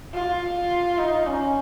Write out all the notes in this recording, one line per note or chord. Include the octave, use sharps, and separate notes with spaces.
F4
D#4
C#4